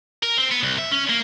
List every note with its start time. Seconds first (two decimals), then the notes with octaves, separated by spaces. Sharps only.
0.23 A#4
0.38 C4
0.51 B3
0.63 C2
0.78 E5
0.91 C#4
1.09 A#3